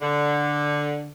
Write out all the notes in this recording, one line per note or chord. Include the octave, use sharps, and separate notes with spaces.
D3